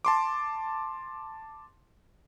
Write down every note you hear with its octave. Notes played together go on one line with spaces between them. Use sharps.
A5 C6 D6